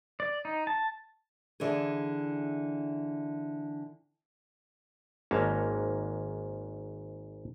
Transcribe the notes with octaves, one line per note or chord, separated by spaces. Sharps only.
D5
D#4
A5
D3 E3 D4 G#4
G#1 G#2 A#3 C#4 A5 A#5